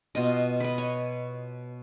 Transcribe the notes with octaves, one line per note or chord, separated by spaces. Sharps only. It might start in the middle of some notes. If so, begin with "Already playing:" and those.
B2 F4 D#5
B4 D#5
C#5